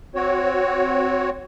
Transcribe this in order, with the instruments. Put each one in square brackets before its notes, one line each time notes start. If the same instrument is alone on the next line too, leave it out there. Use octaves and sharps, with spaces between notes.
[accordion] C4 F#4 C#5